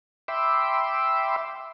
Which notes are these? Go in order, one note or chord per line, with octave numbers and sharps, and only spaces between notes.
E5 G5 B5 C6 D6 E6